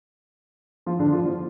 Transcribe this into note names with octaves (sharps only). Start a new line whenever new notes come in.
F3 F4
D3 D4
F3 F4
F3 F4